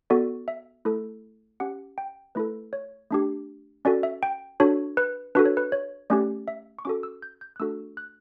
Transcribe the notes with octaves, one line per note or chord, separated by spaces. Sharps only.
B3 F#4 A4 D5
E5
A3 E4 A4
C#4 G4 F#5
G5
A3 E4 A4 B4
C#5
A3 D4 G4
C#4 F#4 A4 D5
E5
G5
D4 F#4 A4 C#5
B4
D4 F#4 A4 B4
C#5
B4
C#5
A3 C#4 G4 D5
E5
C#6
C#4 F#4 A4 D6
E6
G6
G6
F#6
A3 D4 F#4 A4 E6
F#6